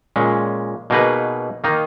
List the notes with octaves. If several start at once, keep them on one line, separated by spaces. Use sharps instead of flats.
A#2 G#3 C#4
B2 A#3 D#4 G#4 B4
D#3 A#3 D#4